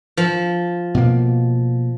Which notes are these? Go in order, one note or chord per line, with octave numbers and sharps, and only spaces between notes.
F3
B2 A#3